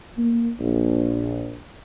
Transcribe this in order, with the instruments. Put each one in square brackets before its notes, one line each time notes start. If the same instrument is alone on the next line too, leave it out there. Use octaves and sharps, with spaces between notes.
[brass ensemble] A#3
A#1